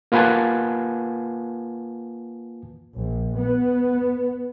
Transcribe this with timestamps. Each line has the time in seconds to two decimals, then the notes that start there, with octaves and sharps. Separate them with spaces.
0.12 A#3 F4 B4 F#5 G#5 A5
2.97 A#1
3.36 B3